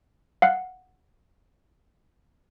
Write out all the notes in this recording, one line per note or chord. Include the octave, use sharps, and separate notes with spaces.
F5 F#5